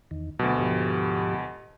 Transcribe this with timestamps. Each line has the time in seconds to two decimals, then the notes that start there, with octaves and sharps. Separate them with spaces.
0.11 E2 D#3
0.39 D2 B2 F#3
0.59 G#2 F3 G4